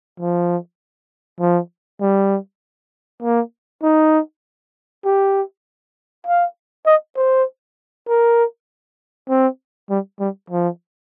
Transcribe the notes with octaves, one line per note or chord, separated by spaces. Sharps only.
F3
F3
G3
A#3
D#4
G4
F5
D#5
C5
A#4
C4
G3
G3
F3